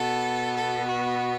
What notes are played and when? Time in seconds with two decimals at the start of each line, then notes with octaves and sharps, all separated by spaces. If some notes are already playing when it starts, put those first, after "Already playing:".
Already playing: B2 B3 A4
0.55 A4
0.87 F#4